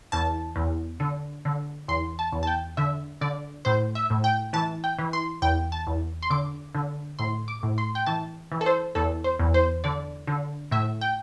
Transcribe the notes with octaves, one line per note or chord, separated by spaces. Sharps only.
E2 A5
E2
D3
D3
E2 C6
A5
E2
A5
G5
D3 E5
D3 D5
A2 C5
E5
A2
G5
E3 A5
G5
E3
C6
E2 G5
A5
E2
C6
D3 D6
D3
A2 C6
D6
A2
C6
G5
E3 A5
E3
A4
C5
E2 A4
C5
E2
C5
D3 D5
D3
A2 E5
G5